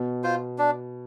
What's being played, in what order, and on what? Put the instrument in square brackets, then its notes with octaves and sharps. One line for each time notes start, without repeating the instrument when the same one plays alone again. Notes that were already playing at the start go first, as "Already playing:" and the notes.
Already playing: [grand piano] B2
[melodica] F4 C5
D4